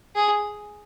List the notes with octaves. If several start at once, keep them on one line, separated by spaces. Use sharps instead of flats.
G#4